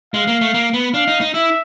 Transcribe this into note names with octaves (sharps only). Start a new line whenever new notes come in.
G#3 F5
A#3
A3
A#3
B3
D4 F5
D#4
D#4
E4 E5